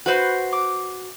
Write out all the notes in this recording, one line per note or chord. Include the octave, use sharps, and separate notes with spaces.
F#4 B4 C5
D6